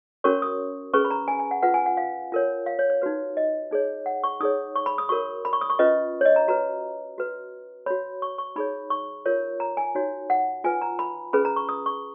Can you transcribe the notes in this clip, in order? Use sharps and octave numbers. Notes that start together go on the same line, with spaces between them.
C#4 F#4 A#4 C#5 C#6
D#6
C#4 G#4 B4 C#6
B5
A#5
G#5
G#5
F#5
F4 B4 F#5
G#5
F#5
F5
F4 A#4 C#5
F5
C#5
C#5
D#4 F#4 B4
D#5
D#4 G#4 C#5
F#5
C#6
D#4 G#4 C#5 D#6
C#6
B5
D#6
F#4 A#4 C#5 C#6
B5
C#6
D#6
C#6
C#4 F4 B4 D#5
C#5
D#5
A#5
F#4 B4 A#5
F#4 B4
F#4 C#5 B5
C#6
C#6
D#4 G#4 C#5 B5
C#6
F4 A#4 C#5
A#5
G#5
D#4 F#4 C#5
F#5
F4 B4 G#5
A#5
B5
C#4 G#4 B4 B5
A#5
C#6
D#6
C#6